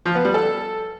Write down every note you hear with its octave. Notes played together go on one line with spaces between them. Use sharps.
F3
B3
G3
A4